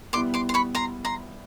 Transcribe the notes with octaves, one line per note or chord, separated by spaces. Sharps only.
B2 G3 B3 E4 C6 D6
C6 D6
C6
B5 C#6
A#5 C6
A#5 C6